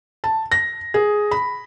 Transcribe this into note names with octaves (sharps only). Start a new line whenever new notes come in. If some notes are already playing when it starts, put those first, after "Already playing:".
A5
A#6
G#4
B5